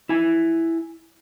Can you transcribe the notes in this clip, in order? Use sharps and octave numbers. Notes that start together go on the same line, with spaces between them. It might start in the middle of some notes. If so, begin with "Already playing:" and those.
E4 G#5